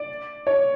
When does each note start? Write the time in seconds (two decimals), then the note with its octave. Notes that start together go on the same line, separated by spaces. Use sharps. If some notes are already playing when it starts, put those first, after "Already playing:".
Already playing: D5
0.47 C#5